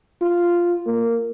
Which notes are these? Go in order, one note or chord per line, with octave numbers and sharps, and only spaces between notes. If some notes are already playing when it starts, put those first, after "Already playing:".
F4
A#3